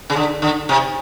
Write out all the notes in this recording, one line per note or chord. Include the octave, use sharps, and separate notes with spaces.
C#3
D3
D3
C3